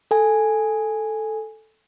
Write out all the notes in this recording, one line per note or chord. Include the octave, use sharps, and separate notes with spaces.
A4 G#5